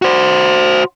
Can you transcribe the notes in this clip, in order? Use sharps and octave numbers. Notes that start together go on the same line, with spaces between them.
F#4 C5